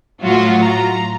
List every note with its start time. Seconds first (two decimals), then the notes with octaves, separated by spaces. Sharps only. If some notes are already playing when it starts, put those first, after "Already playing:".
0.23 A2 F#3 F4 F#4
0.60 A#5